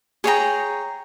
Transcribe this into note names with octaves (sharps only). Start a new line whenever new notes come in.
G#4 C#5 G5 A#5